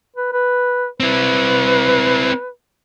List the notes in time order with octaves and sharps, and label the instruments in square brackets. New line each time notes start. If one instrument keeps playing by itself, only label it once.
[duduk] B4
B4
[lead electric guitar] C4 E4 [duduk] B4